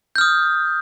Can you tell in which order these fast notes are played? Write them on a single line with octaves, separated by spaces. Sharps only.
G6 F6 D#6